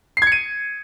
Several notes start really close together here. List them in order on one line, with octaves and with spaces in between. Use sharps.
C7 G#6 C#7 D#7